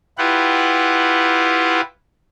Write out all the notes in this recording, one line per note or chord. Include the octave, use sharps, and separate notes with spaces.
E4 F4 G4 B4 F#5